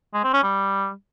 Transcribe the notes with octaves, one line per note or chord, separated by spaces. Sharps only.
G#3
C4
C#4
G3